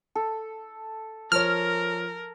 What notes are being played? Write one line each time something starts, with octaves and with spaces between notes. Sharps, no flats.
A4
F3 A#4 C#5 F6